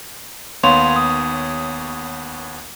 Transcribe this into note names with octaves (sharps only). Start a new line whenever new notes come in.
D#2 B3 C#5 F5 C6 F7
D#6